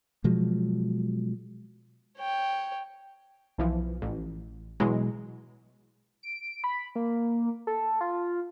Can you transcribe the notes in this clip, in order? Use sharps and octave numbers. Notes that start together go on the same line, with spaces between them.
B2 F3 F#3 G#3
C#5 G5
B1 E3 F3
A1
B2 E3 F#3 G#3
D7
B5
A#3
A4
F4